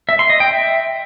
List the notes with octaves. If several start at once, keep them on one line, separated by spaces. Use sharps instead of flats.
E5
C6
D#5
G5
E5